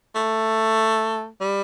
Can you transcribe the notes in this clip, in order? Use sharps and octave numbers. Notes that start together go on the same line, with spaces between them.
A3
G3